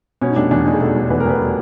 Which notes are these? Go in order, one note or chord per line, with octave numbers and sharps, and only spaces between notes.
B2 C#4
D#4
F1 D4
E2 D4
F1 D#4
G#4
B2 A4
F1
E2 B4
A#4
F1 B4
B2